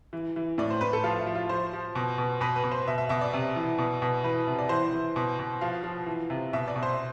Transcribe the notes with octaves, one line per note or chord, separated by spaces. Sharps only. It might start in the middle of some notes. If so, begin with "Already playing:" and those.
E3
E3
A2 D5
C5
A2 B4
A4
F3 F4
E4
F3
F4
F3 C5
F3
B2
B2
B2 B4
B4
B2
C5
B2 E5
E5
B2 E5
D5
C3
E3
B2
B2
E3 B4
C3
D5
E3 C5
E3
B2
B2
F3 F5
F3
E3
C3
B2 E5
D5
B2
C5